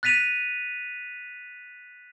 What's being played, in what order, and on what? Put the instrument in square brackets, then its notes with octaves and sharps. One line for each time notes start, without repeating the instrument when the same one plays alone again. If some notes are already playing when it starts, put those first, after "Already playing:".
[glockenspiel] F#6 A6 B6 D#7 F7